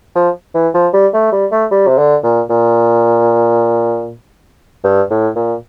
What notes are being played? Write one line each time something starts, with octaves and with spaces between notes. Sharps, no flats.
F3
E3
F3
G3
A3
G3
A3
G3
C3
D3
A#2
A#2
G2
A2
A#2